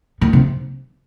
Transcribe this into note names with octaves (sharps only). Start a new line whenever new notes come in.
A#2
C3